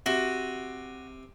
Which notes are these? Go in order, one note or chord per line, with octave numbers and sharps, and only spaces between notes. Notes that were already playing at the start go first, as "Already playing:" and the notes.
C3 F#4